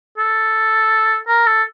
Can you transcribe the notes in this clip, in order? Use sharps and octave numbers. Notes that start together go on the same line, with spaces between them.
A4
A#4
A4